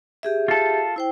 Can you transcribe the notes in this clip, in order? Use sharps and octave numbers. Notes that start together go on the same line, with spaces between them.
G4 G#4 E5
F4 A4
E4 C5 G5